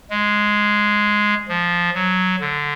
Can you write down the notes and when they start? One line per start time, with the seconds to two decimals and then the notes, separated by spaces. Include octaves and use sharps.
0.10 G#3
1.49 F3
1.94 F#3
2.41 D3